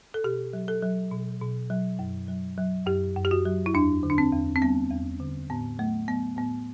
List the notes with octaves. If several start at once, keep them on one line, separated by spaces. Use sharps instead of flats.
A4
B2 G4
F#3
A4
F#3
B2
B2
F#3
F#2
F#3
F#3
F#2 G4
F#2
G4
F#4
F#3
E4
E2 D4
D3
D4
C4
E2
C4
G3 B3
E2
D3
A2 B3
F#3 A3
F#3 B3
A2 B3